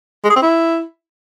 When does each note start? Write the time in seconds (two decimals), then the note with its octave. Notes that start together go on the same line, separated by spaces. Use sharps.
0.24 G#3
0.30 G#4
0.36 C4
0.42 E4